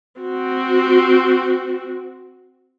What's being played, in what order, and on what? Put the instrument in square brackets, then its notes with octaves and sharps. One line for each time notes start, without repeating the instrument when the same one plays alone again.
[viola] C4 F#4